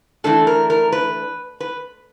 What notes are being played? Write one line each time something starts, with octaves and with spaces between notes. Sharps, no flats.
E3 A3 D4 A4
A#4
A#4
B4
B4